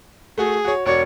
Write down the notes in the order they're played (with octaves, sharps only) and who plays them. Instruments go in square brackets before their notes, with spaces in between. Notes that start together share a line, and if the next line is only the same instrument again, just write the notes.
[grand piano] A3 F#4 [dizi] G#4
[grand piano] F#4 C#5
[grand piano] E1 F#4 D5 [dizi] C#5